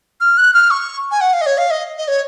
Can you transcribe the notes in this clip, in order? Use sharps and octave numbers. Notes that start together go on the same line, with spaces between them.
F6
F#6
F6
C#6
G#5
F#5
F5
D#5
C#5
F5
D#5
D#5
C#5